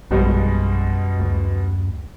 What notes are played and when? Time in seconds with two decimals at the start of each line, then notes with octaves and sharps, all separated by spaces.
0.11 A#1 F#2 B2 G3 G#3
1.20 D2